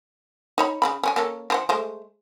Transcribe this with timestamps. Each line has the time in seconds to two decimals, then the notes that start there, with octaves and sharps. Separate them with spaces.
0.58 D#4 C#5 B5
0.82 C#3 E3 B5
1.03 C#4 B4 G#5
1.16 A#3 C#4 A4
1.50 E3 C5 F#5
1.69 G#3 A3 C5